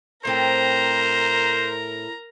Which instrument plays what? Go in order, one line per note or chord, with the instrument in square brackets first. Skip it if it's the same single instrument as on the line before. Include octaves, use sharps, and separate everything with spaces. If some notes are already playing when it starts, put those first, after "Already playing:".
[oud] A2 C4 [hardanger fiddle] A#4 A#5 [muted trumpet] C5